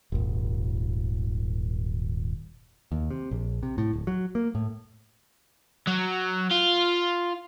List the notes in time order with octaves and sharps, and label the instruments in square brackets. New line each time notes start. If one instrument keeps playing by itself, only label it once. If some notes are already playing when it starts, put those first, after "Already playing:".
[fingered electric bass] D#1 G#1
[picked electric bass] D#2
C3
A#1
C3
A2
D1
F#3
A#3
A2
[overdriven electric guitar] F#3
F4